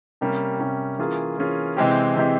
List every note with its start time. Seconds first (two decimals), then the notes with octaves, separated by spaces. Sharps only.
0.21 C3 G3 A#3 C#4
0.60 C3 G3 A#3 C#4
0.99 E3 A#3 C#4 F4 G#4
1.38 E3 A#3 C#4 F4 G#4
1.77 C3 E3 G#3 C4 G4
2.16 C3 E3 G#3 C4 G4